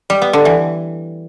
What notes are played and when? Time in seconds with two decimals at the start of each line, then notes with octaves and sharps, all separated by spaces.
0.10 G3
0.22 B3
0.33 D3
0.45 E3